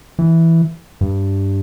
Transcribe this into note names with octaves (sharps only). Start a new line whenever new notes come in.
E3
G2